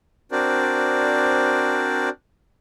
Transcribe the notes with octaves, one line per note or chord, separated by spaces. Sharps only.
C4 D4 F#4 A#4 C5 D5